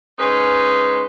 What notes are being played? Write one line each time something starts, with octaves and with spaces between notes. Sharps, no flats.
G#2 C#4 D#4 B4 C6